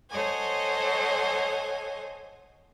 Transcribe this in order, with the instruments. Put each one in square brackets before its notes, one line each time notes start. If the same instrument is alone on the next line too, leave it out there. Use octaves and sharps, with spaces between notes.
[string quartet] A4 C5 C#5 D#5 F#5 G#5